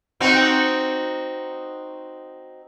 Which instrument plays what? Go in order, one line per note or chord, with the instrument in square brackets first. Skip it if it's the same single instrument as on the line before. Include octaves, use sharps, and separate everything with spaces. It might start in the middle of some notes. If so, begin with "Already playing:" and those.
[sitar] C4 D#4 F#4